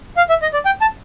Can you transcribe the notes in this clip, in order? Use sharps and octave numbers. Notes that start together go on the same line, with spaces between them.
F5
E5
D#5
D5
G5
A5